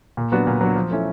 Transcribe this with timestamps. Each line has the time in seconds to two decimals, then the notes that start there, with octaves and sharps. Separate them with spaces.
0.17 A#2
0.32 F#3 B3 D4 F#4
0.47 A#2
0.61 F#3 B3 D4 F#4
0.76 F3
0.91 A3 C#4 E4